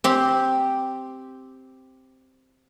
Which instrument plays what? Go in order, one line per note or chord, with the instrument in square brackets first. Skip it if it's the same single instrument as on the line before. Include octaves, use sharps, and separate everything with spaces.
[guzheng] C4 G4